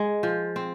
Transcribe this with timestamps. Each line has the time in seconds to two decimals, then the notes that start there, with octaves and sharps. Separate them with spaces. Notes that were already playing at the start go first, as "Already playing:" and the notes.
Already playing: G#3
0.23 F3
0.56 C4